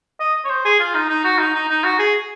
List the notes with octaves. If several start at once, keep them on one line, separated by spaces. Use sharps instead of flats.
D#5
C#5
C5
G#4
F4
D#4
D#4
F#4
D#4
D#4
D#4
F#4
G#4